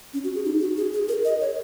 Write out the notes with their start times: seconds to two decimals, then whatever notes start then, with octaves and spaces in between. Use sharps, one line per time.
0.14 C#4
0.24 F#4
0.35 G#4
0.45 D#4
0.61 F#4
0.77 G#4
0.94 G#4
1.09 A#4
1.25 D#5
1.41 C#5